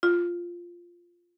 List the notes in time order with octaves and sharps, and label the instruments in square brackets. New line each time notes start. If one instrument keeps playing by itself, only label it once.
[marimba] F4